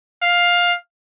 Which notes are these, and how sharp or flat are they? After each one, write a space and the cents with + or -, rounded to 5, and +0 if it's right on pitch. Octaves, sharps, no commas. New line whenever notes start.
F5 +10